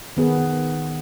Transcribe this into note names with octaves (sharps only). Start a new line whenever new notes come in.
D#3 B3 G#4